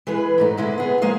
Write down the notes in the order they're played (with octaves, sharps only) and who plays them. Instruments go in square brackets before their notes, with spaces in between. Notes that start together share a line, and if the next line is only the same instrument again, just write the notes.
[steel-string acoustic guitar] E3 G#3 G#4 B4
G#2 A3 D#4
G#2 D3 G#3 E4
B3 G#4
F3 G#3 A#3 G#4 F5